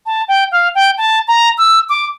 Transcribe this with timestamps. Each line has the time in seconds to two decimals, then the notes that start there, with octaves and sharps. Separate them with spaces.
0.06 A5
0.28 G5
0.52 F5
0.75 G5
0.98 A5
1.28 A#5
1.58 E6
1.89 D6